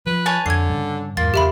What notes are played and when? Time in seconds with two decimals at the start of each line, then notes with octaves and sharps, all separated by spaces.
0.07 F3 B4
0.26 C#5 G#5 A5
0.46 F2 D3 G#6 C7
0.69 G2 C#3
1.17 E2 G#2 A#3 F4 A6
1.34 E2 C#3 G4 E5 B5